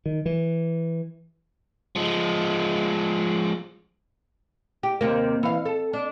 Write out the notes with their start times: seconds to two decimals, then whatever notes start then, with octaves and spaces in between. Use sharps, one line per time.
0.06 D#3
0.26 E3
1.96 F3 G#3
4.83 G4
5.01 D#2 C3 A#3
5.43 E3 F5
5.65 A4
5.93 D4